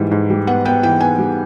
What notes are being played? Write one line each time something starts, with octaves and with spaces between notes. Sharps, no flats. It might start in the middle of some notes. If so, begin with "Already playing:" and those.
Already playing: G#2 E3 G3
G#2
G3
B3 F#5
B3 G5
E3 G5
B3 G#5
G3